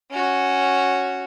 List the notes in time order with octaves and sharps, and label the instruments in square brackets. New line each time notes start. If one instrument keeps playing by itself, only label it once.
[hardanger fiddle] C#4 F#4